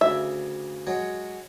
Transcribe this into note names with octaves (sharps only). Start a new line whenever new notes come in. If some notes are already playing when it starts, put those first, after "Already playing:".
D2 C#3 E5
F#3 G#3 C#5